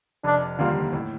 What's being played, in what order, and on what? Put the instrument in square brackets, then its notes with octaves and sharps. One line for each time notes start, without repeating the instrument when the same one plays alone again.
[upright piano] F1 [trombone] D4
[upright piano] D#2 D3 G3 A#3 [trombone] F4
[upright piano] A2